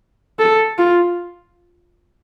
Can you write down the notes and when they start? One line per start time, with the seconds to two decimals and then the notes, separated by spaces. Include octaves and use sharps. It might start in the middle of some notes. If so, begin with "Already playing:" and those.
0.39 A4
0.78 F4